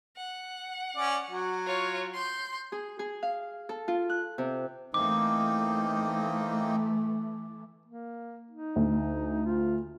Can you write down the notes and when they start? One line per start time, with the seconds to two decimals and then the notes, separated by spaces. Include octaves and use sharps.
0.17 F#5
0.96 C#4 D5
1.31 F#3
1.67 F4 C#5
2.13 C6 G6
2.72 G#4
2.99 G#4
3.23 F5
3.69 A4
3.88 F4
4.10 F#6
4.38 C3
4.94 E3 A3 A#3 C4 D#4 D6
7.86 A#3
8.51 D#4
8.76 D2
9.46 F4